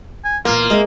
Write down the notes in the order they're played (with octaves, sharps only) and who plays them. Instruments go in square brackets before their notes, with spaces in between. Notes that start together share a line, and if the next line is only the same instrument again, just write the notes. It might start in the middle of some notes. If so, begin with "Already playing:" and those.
[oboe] G#5
[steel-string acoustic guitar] E2 A#2 [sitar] A#3 [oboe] F4
[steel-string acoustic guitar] G#3 C4 E5 [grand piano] G#4 D#5